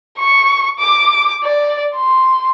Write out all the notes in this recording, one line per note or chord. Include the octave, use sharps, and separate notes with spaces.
C#6
D6
D5
C6